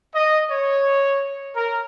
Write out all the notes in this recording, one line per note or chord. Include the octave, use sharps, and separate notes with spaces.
D#5
C#5
A#4